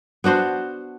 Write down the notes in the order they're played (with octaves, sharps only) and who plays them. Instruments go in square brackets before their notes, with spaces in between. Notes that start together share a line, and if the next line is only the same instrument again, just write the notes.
[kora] B3 D4 F#4 C5